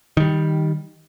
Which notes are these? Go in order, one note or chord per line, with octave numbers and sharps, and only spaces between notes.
D#3 G3